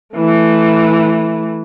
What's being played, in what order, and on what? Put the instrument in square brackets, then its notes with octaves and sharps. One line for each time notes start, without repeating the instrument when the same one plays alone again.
[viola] E3 A3